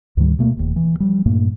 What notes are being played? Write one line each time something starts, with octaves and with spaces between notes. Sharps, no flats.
D2 G#2 D#3 G3
B2 A3 A#3
D#1 D#2
E3
F3 G3
G2 A#2 A3 A#3